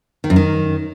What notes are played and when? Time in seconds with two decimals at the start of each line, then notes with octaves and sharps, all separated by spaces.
0.24 D#3
0.30 F#2
0.36 D#3